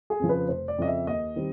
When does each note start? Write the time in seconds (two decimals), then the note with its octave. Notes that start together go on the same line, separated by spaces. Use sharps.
0.10 G#4
0.19 F2 C#3 F3
0.29 B4
0.49 F1 C5
0.68 D5
0.78 F2 C#3 F3 D#5
0.87 E5
1.07 D#2 D#5
1.36 D#3 G3 C4